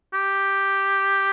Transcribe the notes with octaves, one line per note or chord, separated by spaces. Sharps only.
G4